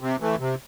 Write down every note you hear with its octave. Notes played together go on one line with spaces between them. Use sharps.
C3
E3 A3
C3